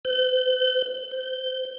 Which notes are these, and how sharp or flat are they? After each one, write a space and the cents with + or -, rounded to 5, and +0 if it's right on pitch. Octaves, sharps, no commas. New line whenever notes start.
C5 -45
C5 -20